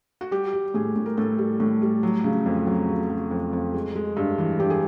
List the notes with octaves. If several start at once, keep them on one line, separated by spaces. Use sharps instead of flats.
F#4
G3 G4
G3
A2 G#4
A2
A#4
A2 A4
G3
A2
G3
F#3
C#3
F2
F#3
C#3
F#3
F2
F2
G#3
G#3
G2
E3
G2 G4
G#4